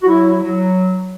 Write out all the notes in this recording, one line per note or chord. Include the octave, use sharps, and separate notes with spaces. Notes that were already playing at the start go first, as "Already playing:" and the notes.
F#4
F#3 E4
F#3